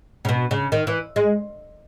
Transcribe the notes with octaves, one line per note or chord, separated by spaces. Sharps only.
C#3
B2
C#3
D#3
E3
G#3